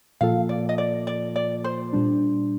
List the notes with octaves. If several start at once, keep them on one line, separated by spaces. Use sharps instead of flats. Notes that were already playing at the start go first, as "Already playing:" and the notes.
A#2 F3 A#3 F4 A4 F5
D5
D#5
D5
D5
D5
C5
A#2 G3 D4